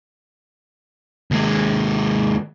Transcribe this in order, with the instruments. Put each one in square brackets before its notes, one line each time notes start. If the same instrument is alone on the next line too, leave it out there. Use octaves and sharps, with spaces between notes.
[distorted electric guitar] D#2 G#3